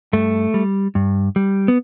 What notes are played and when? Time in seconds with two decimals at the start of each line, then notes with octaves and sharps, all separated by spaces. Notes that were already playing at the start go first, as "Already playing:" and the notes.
0.13 G2 A3
0.54 G3
0.95 G2
1.36 G3
1.68 B3